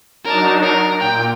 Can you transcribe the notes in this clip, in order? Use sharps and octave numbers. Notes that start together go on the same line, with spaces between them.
F#3 D4 D#4 A#4 A5
A#4
A#2 G5